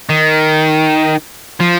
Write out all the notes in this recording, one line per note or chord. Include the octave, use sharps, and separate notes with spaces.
D#3
F3